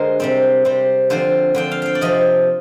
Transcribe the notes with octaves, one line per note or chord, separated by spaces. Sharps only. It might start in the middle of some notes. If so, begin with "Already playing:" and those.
Already playing: D3 G#3 A#4 C5
C3 G3 C4
C3 G3 C4
D3 F3 C4 C5
D3 F3 C4 G5
F5
F5 G5
D5
C3 F3 C4 D#5